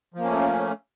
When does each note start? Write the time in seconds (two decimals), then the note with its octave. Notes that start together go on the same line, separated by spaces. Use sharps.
0.14 F3
0.19 A#3
0.24 C#4
0.29 A3